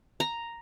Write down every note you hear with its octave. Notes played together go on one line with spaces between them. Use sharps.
A#5